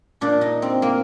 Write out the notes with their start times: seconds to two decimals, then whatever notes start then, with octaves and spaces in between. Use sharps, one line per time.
0.21 A#2 D4
0.41 D#4
0.62 C4
0.82 A#3